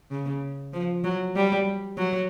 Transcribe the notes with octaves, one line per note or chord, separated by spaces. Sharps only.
C#3
F3
F#3
G3
F#3